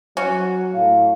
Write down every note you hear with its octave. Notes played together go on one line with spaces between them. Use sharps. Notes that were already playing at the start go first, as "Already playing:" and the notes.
F#3 C#4 F#4
A2 F5